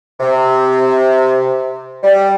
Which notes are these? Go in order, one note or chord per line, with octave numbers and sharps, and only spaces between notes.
C3
G3